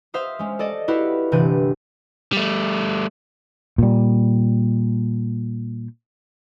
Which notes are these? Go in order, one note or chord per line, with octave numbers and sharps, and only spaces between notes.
C5 E5 F5 D#6
G#3 C#4
A4 D5 D#5
E4 F#4 G4 B4 E5 F5
G1 C3 E3 D4 G6 D#7
G3 A3
A#2 G3